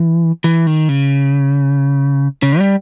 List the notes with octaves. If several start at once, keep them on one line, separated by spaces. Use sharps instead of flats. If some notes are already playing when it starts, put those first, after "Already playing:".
Already playing: E3
E3
D#3
C#3
C#3
G3